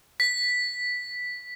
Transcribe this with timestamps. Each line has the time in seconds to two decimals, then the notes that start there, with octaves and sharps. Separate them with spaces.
0.20 B6